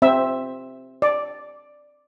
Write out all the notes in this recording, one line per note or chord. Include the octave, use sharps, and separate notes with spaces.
C4 E5
D5